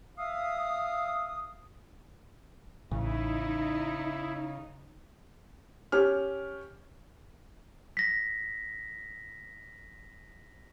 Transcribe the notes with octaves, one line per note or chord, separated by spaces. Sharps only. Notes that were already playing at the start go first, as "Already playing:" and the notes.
E5 F5 D#6
A1 C#3 D#4 E4
C#4 G4 F6
A#6 B6